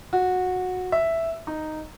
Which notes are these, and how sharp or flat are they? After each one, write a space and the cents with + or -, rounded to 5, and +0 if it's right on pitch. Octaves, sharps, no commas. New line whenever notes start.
F#4 -15
E5 +0
D#4 -5